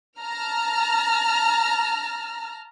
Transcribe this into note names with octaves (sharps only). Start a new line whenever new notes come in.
A5 A#5 F6